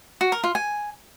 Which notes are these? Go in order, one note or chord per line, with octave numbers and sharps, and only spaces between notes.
F#4
A#4
F4
G#5